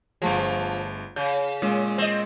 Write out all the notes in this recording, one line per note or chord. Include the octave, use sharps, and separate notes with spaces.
G1 F3 A3 G#4
C#3 G6
A#2 G#3 C#4
C4 D#5